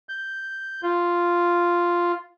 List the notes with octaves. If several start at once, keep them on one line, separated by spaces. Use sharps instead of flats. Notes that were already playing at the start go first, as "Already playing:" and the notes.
G6
F4